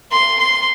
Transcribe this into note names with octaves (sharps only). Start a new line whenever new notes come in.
C6
C6